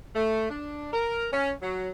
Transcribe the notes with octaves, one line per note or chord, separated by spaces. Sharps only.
A3
D4
A#4
C#4
F#3